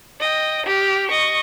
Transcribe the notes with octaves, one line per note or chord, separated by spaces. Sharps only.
D#5 G5
G4 F6
D#5 C#6